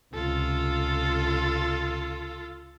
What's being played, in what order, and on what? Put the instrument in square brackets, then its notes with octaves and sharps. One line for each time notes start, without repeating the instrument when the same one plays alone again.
[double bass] C#2 C3 [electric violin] F4 A4